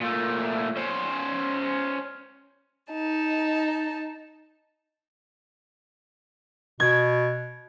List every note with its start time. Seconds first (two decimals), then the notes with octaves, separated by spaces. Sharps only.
0.01 A#2 A3
0.76 C#4 C5
2.90 D#4 A5
6.80 B2 G#6